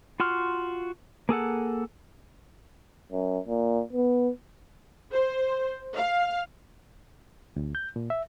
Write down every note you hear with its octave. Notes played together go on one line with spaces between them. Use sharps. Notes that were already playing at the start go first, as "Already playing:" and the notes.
F4 F#4 C6 F6
A#3 G#4 A4 F#5
F#2
A#2
B3
C5
F5
D2
G6
A#2
E5